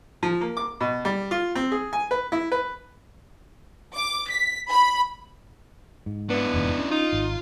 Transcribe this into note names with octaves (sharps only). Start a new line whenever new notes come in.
F3
A#3
D6
B2
G3
F4
C4
G#4
G#5
B4
E4
B4
D6
B6
B5
G#2
B3 D4 E4
F1 E2 G#2
C#4
D#4 F4
G#1